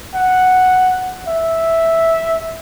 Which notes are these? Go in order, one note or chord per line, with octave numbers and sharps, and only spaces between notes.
F#5
E5